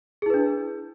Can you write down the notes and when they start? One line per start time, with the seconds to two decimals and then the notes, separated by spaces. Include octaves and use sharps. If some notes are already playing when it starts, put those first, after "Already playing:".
0.22 G#4
0.26 E4
0.30 B4
0.34 D4